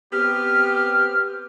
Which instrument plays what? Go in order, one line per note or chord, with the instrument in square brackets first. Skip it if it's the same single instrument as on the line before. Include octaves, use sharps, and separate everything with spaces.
[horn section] B3 C4 G4 [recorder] F6